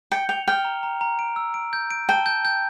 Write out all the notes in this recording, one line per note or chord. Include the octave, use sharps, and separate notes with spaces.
G5 C#7
G5 F7
G5 F6
A#5
A#5
A#5
D7
E6
D7
G6
D7
G5 A5
G6
G6